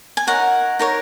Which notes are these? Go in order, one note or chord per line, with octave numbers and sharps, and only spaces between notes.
G#5
D#4 A#4 C#5 F#5
D#4 A#4 C#5